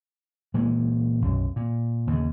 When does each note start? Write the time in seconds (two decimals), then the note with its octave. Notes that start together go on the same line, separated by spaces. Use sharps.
0.54 A#2 E3 G#3
1.22 B1 F#2
1.56 A#2
2.07 D#2 C#3